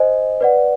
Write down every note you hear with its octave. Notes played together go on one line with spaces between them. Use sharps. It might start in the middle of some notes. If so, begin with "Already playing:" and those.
Already playing: C5 D#5 G#5
B4 D5 F#5